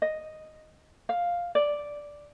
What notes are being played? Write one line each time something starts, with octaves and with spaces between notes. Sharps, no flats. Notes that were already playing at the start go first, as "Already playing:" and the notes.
D#5
F5
D5